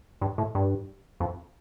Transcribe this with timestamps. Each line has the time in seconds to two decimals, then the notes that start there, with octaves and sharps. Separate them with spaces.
0.21 G2
0.38 A2
0.55 G2
1.20 F2